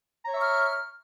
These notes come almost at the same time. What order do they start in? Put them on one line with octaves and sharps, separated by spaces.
A#5 C#5 E5 C#6 F6